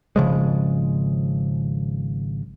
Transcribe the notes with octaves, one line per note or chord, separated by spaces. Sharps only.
G#1 C#3 F3 G#3